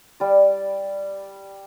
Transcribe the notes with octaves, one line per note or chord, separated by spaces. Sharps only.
G3 D5